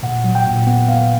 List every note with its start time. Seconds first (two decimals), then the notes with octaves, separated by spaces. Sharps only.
0.03 A#2 F#5
0.24 F#3
0.35 G5
0.46 A#2
0.67 B3 F#5
0.88 B3 F5